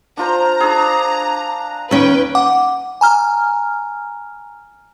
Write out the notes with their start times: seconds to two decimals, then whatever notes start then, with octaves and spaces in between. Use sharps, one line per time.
0.17 D4 F4 C5 A#5
0.60 D4 G#4
1.91 D#2 C#4 B4 G5
2.35 F#5 D6
3.01 G#5 A#5 F6